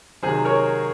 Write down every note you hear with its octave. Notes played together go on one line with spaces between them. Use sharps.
C3 D#3 F#3 G#4 C5
A#4 C#5